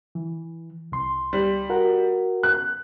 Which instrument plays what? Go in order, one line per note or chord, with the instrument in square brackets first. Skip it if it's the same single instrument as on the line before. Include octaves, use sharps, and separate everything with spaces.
[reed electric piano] E3
C2 C6
[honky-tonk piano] G3
[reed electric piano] F#4 A#4 F#5
[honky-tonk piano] F#6